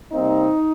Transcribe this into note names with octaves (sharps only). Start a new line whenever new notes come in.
C3 G3 A#3 C4 D#4